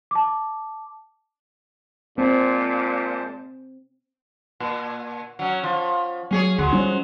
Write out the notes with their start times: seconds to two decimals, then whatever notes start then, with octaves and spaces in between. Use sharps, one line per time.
0.11 A5 D6
2.18 A#2 G#3 C4 C5 A5
4.60 A#2
5.39 F#3 C#4
5.63 F3
6.31 F#3 C#4 G#4 C#5
6.58 D2 F#3 G#3
6.72 F3 G3 C#4